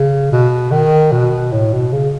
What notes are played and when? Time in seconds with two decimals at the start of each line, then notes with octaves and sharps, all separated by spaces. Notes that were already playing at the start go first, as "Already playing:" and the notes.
Already playing: C#3
0.32 B2
0.72 D#3
1.12 B2
1.52 A2
1.73 B2
1.92 C#3